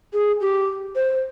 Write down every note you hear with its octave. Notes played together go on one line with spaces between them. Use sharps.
G#4
G4
C5